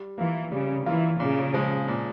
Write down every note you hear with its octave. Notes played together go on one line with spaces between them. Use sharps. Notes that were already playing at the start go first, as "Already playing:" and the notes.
Already playing: G3
E3 A#3 F4
C#3 G3
E3 A#3 F4
A#2 C#3
F3 G#3
A#2